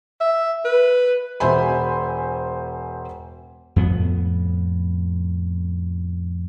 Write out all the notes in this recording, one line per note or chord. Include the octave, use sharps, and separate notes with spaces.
E5
B4
E1 C5 E5 G#5 B5
F2 A2 B3